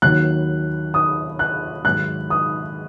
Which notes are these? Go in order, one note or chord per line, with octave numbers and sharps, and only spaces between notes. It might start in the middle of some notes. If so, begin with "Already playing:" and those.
D#2 D#3 F#3 F#6
D#6
F#6
G#2 D#3 F#3 F#6
D#6